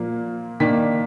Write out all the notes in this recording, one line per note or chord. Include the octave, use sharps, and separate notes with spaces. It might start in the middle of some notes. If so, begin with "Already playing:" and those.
Already playing: A#2 F3 A#3
D#3 A#3 D4 B6